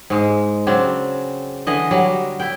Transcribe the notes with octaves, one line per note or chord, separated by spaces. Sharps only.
G#2 G#3
C#3 F#3 C4 D4
D3 E3 D#5
F#3 G3
E4 G5